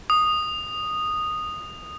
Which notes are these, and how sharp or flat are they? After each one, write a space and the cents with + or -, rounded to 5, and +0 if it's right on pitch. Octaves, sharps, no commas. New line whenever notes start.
D#6 -10